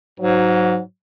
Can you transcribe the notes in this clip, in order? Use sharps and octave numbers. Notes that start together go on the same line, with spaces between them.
G#2 F#3